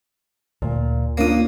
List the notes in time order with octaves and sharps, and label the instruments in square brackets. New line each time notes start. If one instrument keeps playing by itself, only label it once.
[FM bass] D2 [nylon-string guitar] A#2
[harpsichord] A#3 D#6 [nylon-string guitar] C#4 D4 F4